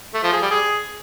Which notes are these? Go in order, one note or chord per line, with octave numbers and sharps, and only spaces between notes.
A3
F3
G#4
G3
G#4